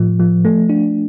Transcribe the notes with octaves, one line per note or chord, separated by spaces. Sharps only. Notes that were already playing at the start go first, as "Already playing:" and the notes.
Already playing: A2 F3
F3
A3
D4